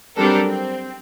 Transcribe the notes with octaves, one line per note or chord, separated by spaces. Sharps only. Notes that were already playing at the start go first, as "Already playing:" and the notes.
F#3 G3 C4 D4 A4 A#4
C4